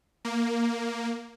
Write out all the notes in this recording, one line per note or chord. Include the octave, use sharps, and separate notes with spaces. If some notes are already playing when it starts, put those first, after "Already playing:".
A#3